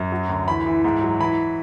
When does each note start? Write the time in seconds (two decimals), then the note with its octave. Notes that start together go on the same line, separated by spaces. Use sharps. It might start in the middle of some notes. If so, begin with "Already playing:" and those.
Already playing: F#2
0.12 F#3
0.29 D2
0.47 E3 B5
0.66 E3
0.84 G#2
1.01 F#3
1.20 E3 B5